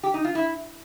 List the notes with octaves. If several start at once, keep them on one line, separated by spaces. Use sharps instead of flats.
G4
D#4
F4
E4